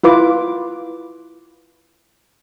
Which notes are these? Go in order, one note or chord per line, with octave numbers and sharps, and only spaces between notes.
E4 F4 B4 D6